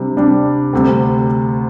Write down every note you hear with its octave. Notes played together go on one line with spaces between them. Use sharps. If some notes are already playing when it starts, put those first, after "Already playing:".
Already playing: C3 G3 D4
C3 G3 D4
D2 C3 G3